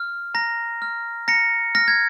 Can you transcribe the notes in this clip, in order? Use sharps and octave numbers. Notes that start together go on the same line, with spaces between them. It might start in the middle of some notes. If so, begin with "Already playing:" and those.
Already playing: F6
A#5 A#6
F6
A#5 A#6 C#7
F6 A#6
G#6